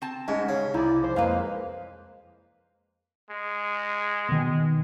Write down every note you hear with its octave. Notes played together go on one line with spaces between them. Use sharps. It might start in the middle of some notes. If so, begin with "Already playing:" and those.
C4 A5
G#2 C#4
C#3
C2 D#4 E4 D5
F3 C5
F2 G#3 A#3 B4 C5 F5
G#3
B2 D#3